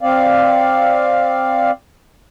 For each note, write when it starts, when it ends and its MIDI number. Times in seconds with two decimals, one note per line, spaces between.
0.01 1.71 60
0.01 1.71 74
0.01 1.71 77